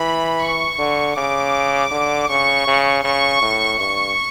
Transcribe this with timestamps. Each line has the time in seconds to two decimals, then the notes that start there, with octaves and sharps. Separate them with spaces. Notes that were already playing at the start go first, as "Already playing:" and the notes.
Already playing: E3 B5
0.41 C#6
0.79 D3
1.16 C#3 D6
1.91 D3
2.29 C#3 C#6
2.67 C#3
3.04 C#3 C#6
3.42 A2
3.79 G2 C#6